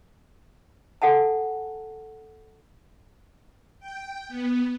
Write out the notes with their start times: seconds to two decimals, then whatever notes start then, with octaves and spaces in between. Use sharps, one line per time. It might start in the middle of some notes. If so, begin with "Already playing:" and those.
1.02 A4 F#5 G#5 A5
3.80 G5
4.29 B3